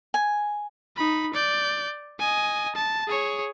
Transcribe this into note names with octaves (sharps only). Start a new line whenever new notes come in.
G#5
D#4 B5
D5 G6
D#5 G#5
A5
G#4 C#5